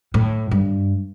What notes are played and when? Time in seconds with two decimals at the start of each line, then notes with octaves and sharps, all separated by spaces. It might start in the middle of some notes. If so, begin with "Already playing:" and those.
0.14 A2
0.51 G2